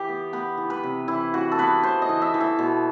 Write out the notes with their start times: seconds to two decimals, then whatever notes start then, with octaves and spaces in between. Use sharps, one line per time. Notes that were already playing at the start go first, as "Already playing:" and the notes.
Already playing: E3 G4
0.08 B3
0.33 B3 B4
0.57 E3
0.70 B4
0.83 C3
1.08 E3 E4
1.34 E3 F#4
1.52 A4
1.58 B3 B4
1.83 E3 C5
2.02 D#5
2.09 E3
2.22 E5
2.34 E3
2.40 E5
2.59 B2